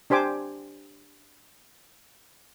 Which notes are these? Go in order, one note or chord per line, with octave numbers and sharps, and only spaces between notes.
D4 G4 C5 G#5 D6